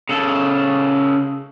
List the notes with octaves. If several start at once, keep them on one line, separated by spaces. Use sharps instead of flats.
C#3 A4